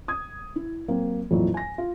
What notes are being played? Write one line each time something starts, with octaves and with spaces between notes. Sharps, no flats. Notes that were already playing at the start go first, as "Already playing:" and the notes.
D#6 G#6
E4
F#3 A#3 C4
F2 A#2 E3 F#3
G#5 A#6
F4